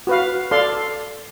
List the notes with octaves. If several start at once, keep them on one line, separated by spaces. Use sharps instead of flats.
F#4 B4 F5
A4 D5 F5 C6